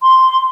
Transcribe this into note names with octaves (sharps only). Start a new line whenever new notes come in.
C6